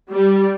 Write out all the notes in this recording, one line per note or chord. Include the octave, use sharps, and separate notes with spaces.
G3